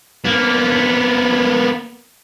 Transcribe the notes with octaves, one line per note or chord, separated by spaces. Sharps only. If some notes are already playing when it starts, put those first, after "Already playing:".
A#3 B3